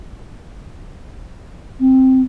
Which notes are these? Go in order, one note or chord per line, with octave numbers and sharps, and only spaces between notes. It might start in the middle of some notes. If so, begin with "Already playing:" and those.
C4